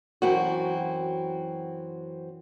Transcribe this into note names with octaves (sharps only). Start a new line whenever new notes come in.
F#2 E3 C4 F#4